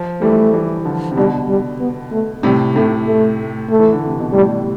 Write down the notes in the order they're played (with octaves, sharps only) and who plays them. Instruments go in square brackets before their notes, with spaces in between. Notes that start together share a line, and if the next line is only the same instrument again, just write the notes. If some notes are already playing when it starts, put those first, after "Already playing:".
Already playing: [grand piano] F3
[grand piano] E3 G3 [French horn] A3
[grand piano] E3 G3
E3
D3 F3
C3
[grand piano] B2 D3 [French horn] G3
[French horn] G3
B3
A3
[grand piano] A2 C3 [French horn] G3
[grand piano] A2 C3 [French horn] A3
[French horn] A3
A3
[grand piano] E3
D3
C3
B2
[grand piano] A2 [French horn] G3